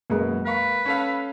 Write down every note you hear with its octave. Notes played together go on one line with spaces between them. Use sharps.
F#2 B2 G#3 A#3
A#4 B4 F5 C#6
C#4 A4 F5